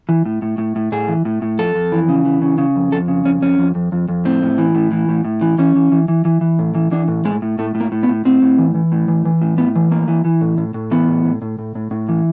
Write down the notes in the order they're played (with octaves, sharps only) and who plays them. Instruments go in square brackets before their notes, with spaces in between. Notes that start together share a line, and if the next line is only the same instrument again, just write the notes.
[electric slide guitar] E3
A2
A2
A2
A2
A2 G#4
E3
A2
A2
F2 A4
F2
E3
C#3
E3
C#3
C#3
F2
F2 A4
C#3
F2 C#4
F2 C#4
F2
F2
F2
F2
A2 C4
A2
E3
A2
E3
A2
A2
E3
E3 C#4
E3
E3
E3
E3
E3
A2
E3
E3 D4
A2
A2 G#3
A2
A2 A3
A2
A#3
A2
B3
A2
A2 C4
A2
E3
E3
A2
E3
E3
A2
A2 B3
E3
A2 A#3
E3
E3
A2
A2
A2
E3 B3
A2
A2
A2
A2
A2
A2
E3